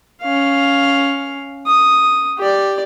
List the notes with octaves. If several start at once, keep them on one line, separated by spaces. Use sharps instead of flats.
C#4 F5
D#6
G4 D5